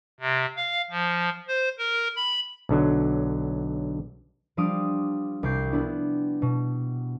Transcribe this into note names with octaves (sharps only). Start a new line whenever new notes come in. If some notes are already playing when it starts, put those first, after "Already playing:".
C3
F5
F3
C5
A#4
B5
B1 D3 F#3
F3 G3 D4 F5 D#6 D7
C2 D6 G6 C7
B3 D4 E4
B2